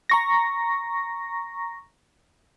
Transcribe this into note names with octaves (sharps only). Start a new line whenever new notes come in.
A#5 C#6 A#6